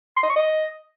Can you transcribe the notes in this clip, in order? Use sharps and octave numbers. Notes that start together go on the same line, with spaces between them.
C6
D#5
C#6
D#5